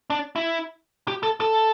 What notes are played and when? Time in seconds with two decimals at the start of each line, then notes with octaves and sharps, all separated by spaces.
0.10 D4
0.36 E4
1.08 G4
1.23 A4
1.41 A4